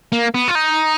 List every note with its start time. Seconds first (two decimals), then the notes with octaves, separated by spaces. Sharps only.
0.12 A#3
0.35 B3
0.48 F4
0.55 D#4